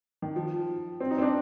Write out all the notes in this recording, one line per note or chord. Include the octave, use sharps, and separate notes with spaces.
D#3
F3
C4
D#4
C4
D4